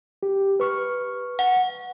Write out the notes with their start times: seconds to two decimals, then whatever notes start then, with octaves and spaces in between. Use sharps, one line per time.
0.23 G4
0.60 B4 C#6 F6
1.39 F#5